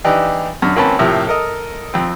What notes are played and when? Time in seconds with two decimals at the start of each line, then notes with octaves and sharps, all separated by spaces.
0.04 E3 D4 D#4 G4
0.62 F#2 D3
0.76 G#1 A#3 C4 C#4 B4 A5
0.99 A2 C3 F3 A#3
1.27 A4 A#4 D#5
1.94 F2 C4